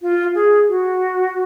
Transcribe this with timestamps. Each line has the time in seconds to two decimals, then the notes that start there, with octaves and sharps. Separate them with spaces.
0.02 F4
0.35 G#4
0.68 F#4